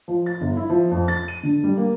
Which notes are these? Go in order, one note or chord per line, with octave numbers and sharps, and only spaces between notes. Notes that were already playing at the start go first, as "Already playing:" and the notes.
F3
A6
G1
E4
F3
F2
A6
D#7
D3
G3
A#3